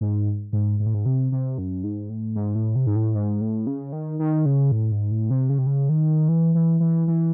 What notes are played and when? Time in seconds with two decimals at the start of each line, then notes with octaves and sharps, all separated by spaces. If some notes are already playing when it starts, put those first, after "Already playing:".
0.01 G#2
0.53 G#2
0.80 G#2
0.86 A2
0.94 G#2
1.06 C3
1.32 C3
1.58 F#2
1.84 G#2
2.09 A2
2.36 G#2
2.55 A2
2.75 C3
2.87 G#2
2.96 A2
3.15 G#2
3.41 A2
3.67 C#3
3.93 D#3
4.19 D#3
4.46 C#3
4.72 A2
4.92 G#2
5.11 A2
5.30 C3
5.49 C#3
5.58 C3
5.67 C#3
5.89 D#3
6.28 E3
6.55 E3
6.80 E3
7.08 E3